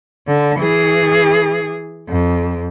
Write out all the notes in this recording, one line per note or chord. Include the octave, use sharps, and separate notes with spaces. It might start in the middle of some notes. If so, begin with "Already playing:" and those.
D3
E3 G#4
F2